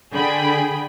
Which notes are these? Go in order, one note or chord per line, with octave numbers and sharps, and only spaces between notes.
D3 G#4 G5 B5